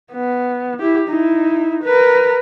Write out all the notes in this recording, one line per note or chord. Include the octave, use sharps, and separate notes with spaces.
B3
E4 G4
D#4 E4
A#4 B4